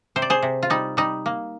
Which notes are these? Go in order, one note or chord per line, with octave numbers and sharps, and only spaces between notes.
C3 C5
D5
G#4 C5
C3
F4
G3 D#4
G3 D#4
A#3